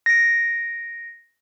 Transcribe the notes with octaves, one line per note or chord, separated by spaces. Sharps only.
A#6 D7